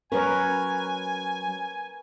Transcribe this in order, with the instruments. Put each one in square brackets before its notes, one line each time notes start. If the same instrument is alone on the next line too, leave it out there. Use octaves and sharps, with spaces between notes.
[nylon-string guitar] F#3 C#4 [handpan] A#4 B4 C#5 [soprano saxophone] G#5